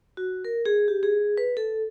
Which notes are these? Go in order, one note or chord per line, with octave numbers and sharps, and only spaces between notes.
F#4
A#4
G#4
G4
G#4
B4
A4